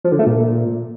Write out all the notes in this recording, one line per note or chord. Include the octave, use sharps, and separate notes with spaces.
F3
D3
A3
A#2